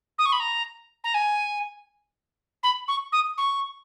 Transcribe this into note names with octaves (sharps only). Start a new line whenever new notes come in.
D#6
C#6
B5
A#5
A#5
G#5
B5
C#6
D#6
C#6